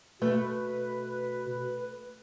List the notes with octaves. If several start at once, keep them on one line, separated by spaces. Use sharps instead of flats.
B2 A3 B4